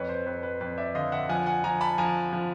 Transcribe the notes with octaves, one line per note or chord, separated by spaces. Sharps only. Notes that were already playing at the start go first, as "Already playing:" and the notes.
Already playing: F2 B4 C#5
C5
F2 B4
B4
F2 B4
D5 E5
D3 D#5 F5
E5 F#5
F3 F#5 G#5
F#5 G#5
F3 G#5 A#5
A5 B5
F3 G#5 A#5
F3